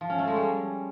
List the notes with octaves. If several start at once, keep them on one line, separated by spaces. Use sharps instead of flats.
F3
C#4
A3
G#3
G3